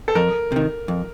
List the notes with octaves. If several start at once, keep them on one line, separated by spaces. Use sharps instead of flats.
A4
F2 A#4
C3 D#3
F2